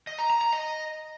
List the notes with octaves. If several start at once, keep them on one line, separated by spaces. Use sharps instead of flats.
D#5
A#5
A#5
A#5
D#5